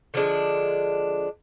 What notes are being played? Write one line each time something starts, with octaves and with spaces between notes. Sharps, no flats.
D3 F3 G#3 D4